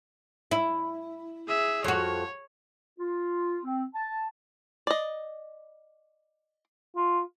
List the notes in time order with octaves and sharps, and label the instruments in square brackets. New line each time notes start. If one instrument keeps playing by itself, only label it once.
[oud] E4
[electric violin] G#4 E5
[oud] F2 F#4 [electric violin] C#5
[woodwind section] F4
C4
A5
[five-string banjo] D5 D#5
[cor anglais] F4